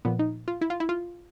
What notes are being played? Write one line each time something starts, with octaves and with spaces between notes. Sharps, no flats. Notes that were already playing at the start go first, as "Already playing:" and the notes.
A#2 F3 B3
D#4
F4
E4
F4
E4
F4